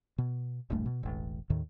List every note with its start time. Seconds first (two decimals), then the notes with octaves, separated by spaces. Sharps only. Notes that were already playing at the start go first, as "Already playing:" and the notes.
0.18 B2
0.70 E1 A#1 G2 A3
0.86 B2
1.03 E1 A1
1.50 D#2 A2 D#3